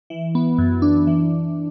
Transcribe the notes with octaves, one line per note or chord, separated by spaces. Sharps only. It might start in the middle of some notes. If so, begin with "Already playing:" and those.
E3
B3
F#2
D4
E3